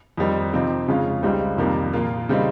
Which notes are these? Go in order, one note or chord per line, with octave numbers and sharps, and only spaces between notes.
F2 D#3 G3 C4 D#4
C3 F3 C4 D#4
F2 C#3 G#3 C#4 F4
C#2 C#3 G3 C4 D#4
F2 C3 D#3 G3 A#3
A#2 F3 A#3 F4
C#3 G3 C4 D#4